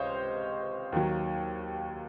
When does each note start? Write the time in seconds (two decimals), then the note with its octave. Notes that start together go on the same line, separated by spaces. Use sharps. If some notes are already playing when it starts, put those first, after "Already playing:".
Already playing: C#2 C3 C5 C#5 D#5 F5
0.92 D#2 D#3 F#3